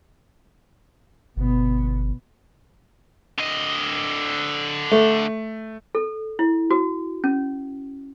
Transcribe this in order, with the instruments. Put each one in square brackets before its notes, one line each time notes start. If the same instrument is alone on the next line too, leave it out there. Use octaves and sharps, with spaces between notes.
[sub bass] G1 [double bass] B2 B3
[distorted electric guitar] D3 D#5
[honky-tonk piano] A3
[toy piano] A4
E4
F#4
C#4